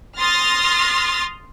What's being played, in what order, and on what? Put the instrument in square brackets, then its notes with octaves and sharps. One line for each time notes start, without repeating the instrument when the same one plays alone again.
[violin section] C6 D#6 F6 A6 A#6